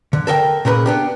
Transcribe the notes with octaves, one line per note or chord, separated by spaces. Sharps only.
D3
A4 A#4 D5 G5
A#2 C#3 A#4 B4
B3 D4 G4